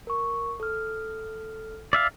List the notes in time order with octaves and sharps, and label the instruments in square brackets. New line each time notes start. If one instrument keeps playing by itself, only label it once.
[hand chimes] A#4 C#6
A4 F6
[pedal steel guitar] D5 E5 F5